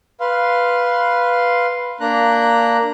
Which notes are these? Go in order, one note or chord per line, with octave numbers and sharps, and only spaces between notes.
B4 F5 C6
A#3 D4 A#5 F#6